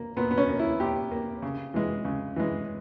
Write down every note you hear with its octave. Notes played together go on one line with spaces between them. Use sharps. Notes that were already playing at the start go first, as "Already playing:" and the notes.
Already playing: A#3
A#2 B3
B3
C#4
A#3
E4
A#2 G4
A#3
C#3
E3 G#3
C#3
E3 G#3